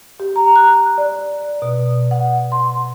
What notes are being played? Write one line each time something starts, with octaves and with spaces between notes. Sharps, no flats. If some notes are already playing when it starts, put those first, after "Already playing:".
G4
A#5
F#6
D5
B2
F#5
C6